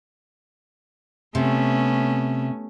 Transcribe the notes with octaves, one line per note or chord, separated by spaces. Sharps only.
C3 A3 B3 C#4